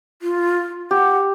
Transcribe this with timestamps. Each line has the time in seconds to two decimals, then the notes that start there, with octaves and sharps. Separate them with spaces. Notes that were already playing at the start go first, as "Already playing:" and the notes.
0.22 F4
0.91 G4 F#5